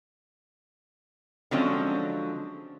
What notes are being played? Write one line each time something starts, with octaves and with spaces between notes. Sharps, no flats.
D3 F3 F#3 G#3 C4 C#4